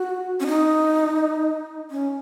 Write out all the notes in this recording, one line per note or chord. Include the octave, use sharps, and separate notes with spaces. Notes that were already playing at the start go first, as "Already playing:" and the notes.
Already playing: F#4
C#4
D#4
C#4